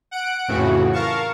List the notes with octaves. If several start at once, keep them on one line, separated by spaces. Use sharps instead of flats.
F#5 F#6 D7
F2 A2 C#3 E3 F#4
A#4 F5 A5 C#6